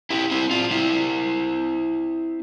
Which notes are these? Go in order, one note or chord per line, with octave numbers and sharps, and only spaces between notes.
E4 G4
C4 E4
D4 F4
C4 E4